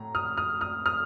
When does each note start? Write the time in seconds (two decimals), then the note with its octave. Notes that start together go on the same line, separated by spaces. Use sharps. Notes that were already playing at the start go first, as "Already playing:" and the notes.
Already playing: A2 A#5
0.15 D#6 F6
0.37 D#6 F6
0.61 D#6 F6
0.86 D#6 F6